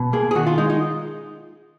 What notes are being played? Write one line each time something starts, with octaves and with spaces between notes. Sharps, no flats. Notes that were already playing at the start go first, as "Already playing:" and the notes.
Already playing: B2
A#3 G#4
G#4
D#3 F#4
F4
G#3 D#4
D#4